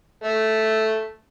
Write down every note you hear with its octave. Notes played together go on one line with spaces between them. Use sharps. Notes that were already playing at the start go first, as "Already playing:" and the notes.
A3